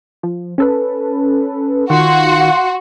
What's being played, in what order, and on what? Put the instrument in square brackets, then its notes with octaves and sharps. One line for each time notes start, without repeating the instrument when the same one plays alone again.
[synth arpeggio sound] F3
C#4 A4 B4
[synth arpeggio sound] D#3 [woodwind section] F4 F#5 C6 [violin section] F#4